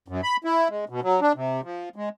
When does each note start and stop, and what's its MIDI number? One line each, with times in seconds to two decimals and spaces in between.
0.08 0.21 42
0.23 0.36 83
0.45 0.68 64
0.69 0.85 56
0.89 1.00 47
1.03 1.20 54
1.21 1.33 62
1.36 1.61 48
1.64 1.89 53
1.96 2.09 56